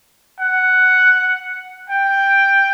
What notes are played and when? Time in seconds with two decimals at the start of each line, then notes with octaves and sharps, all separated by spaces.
0.40 F#5
1.90 G5